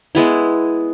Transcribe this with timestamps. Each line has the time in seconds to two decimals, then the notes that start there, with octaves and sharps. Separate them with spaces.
0.15 G#3 B3 E4